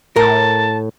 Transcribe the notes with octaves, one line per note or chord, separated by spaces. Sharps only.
A2 A#4 A5